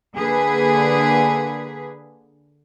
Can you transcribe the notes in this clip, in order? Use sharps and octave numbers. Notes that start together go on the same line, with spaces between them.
D3 A#3 G#4 B4